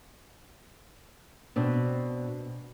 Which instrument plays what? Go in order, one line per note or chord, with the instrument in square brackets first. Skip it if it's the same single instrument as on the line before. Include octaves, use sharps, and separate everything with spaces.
[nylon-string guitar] B2 C4 D4